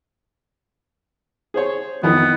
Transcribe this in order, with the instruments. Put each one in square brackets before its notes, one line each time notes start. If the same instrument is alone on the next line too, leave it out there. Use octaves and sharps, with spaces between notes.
[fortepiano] G#4 C5 C#5
[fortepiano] F2 D#3 E3 [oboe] B3